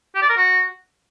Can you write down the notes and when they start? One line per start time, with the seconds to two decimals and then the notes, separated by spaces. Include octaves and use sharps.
0.15 G4
0.22 D5
0.29 A#4
0.37 F#4